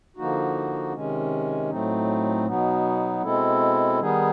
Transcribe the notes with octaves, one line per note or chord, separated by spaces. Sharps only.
D3 F3 A#3 D#4 F#4
C3 D#3 G#3 C#4
A2 F#3 A3 C4 D#4
B2 F#3 B3 D#4
B2 G#3 C4 E4 A4
D#3 G3 B3 D#4 G#4